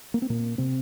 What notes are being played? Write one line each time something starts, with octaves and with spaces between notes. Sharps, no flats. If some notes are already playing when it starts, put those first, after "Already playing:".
A#3
C4
A#2 A#3
C3 C4